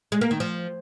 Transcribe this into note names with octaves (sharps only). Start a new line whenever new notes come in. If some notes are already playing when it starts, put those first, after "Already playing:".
G#3
A#3
D#3
F3